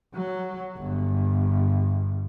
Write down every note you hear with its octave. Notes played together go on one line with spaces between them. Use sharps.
F#3
G1